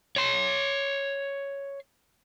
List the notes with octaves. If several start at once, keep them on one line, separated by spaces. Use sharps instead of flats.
C#5 C6